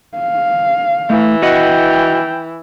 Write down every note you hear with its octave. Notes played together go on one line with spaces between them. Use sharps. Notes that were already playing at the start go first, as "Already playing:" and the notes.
F5
E3 A3
F#4 D#5 F#5 G5